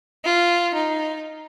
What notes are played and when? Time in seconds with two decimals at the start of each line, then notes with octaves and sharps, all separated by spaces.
0.24 F4
0.74 D#4